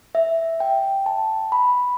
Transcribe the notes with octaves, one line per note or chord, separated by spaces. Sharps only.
E5
G5
A5
B5